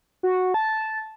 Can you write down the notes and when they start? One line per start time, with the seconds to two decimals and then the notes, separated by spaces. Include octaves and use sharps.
0.23 F#4
0.54 A5